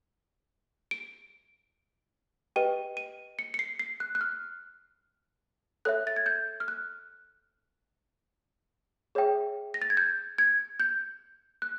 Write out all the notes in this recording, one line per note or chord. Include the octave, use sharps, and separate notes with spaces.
D7
G4 B4 D#5 G5 D#7
D#7
C#7
C#7
C7
C7
F#6
F#6
F6
A4 C#5 E5 F#6
A6
G#6
G6
F6
F#6
G#4 C#5 E5 G5
A#6
A6
G#6
G6
G#6
G6
F#6